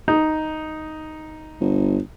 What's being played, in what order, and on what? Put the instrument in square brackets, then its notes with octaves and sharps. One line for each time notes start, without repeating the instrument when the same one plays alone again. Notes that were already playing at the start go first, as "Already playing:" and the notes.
[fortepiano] D#4
[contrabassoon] G1